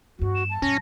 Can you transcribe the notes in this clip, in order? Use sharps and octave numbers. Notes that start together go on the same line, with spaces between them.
E2 G2 F#4
E7
A5
F#2 A#2 C#4 A#6